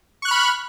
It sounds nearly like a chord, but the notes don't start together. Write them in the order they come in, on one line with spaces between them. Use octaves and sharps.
C#6 F#6 F6 B5